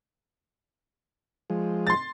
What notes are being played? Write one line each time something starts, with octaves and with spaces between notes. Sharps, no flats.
F3 G#3
C6 A6